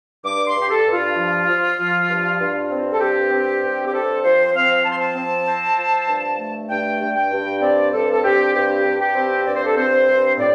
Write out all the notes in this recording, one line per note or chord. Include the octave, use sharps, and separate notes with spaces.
G2 D6
C6
G2
G4
A4
G2
F4
F3
F3
F3
G2
G2
C4
A4
G2 G4
C4
G2
G4
C4 A4
F3 C5
C4 F5
F3 A5
C6
A5
C4
C4
F3
G2
A3
G2 G5
G2
G5
G2
C4 D5
G2 A4
A4
C4 G4
G2 G4
G2
G4
C4
G2 D5
C5
A4
C4 C5
G2
A2 D5